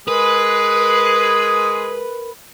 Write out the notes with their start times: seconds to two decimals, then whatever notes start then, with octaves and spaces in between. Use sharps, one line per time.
0.08 G#3 G#4 A#4 B4 D#6